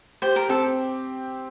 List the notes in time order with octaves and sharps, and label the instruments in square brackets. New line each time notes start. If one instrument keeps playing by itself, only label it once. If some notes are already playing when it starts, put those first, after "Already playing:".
[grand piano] G4 [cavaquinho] C5
[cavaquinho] A#4
[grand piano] C4 [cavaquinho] A4